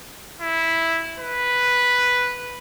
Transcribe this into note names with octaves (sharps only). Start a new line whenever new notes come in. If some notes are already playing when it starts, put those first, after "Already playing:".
E4
B4